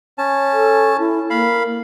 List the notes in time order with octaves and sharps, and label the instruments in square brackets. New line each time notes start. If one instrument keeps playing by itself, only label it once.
[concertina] C#4 A5
[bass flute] A4
E4
[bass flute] A#3 [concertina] F5 B5